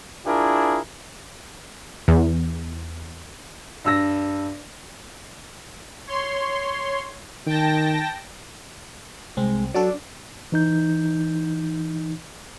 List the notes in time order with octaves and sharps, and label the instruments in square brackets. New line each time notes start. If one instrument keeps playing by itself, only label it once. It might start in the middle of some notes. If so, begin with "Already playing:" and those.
[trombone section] D4 E4 F4 G#4 A#4
[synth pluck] E2
[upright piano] G2 E6 A#6
[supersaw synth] C#5 C6
[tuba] D#3 [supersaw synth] G5 A5 A#6
[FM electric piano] C2 C4 [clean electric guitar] G#3
[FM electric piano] F#3 F#4 A4 [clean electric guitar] D4 D5
[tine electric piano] E3 D#4 G6